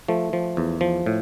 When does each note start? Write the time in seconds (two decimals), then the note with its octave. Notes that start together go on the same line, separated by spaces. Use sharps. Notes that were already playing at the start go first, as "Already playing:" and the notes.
0.08 F3 A3
0.33 F3
0.57 E2
0.81 F3
1.06 A2